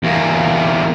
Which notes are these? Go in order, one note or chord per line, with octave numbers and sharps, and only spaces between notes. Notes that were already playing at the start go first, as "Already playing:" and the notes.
E2 A#3